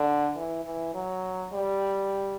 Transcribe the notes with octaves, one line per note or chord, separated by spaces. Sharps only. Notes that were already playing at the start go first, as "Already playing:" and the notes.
Already playing: D3
E3
E3
F#3
G3